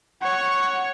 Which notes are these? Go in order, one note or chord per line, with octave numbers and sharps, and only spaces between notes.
C#5 F#5 C#6